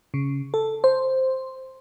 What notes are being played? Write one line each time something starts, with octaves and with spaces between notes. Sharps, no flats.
C#3
A4
C5